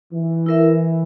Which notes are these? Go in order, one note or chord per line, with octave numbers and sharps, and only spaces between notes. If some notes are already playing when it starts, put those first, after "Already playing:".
E3
E4 A#4 E5